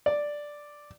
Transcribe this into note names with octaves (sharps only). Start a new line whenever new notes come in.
D5